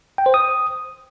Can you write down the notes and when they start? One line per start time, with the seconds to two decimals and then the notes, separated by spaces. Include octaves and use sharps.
0.18 G5
0.26 C5
0.34 D#6